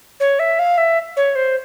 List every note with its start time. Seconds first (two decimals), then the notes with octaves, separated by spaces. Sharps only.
0.20 C#5
0.39 E5
0.59 F5
0.78 E5
1.17 C#5
1.35 C5